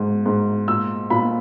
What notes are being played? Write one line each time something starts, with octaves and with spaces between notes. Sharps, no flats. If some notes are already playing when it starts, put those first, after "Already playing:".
Already playing: G#2
G#2
A#2 E6
A#2 B5